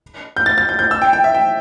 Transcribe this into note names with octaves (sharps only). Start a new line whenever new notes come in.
G6
A6
A6
G6
G6
E6
G5
G5
E5
G5